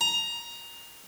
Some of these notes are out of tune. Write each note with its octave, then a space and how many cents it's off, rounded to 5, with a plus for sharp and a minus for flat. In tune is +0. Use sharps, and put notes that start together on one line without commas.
A#5 +15